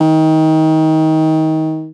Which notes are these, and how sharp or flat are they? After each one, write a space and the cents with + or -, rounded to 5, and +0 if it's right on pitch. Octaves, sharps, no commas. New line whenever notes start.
D#3 +25